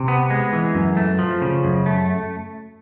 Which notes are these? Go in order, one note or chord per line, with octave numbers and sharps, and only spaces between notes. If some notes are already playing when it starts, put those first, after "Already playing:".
Already playing: C3
B3
G#3
E3
F#2
A3
F3
C#3
F#2
A3